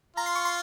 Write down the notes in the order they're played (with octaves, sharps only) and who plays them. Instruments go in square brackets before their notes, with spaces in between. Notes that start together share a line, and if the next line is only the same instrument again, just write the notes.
[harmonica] F4 [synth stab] A#5
[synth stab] C6
C#6
C6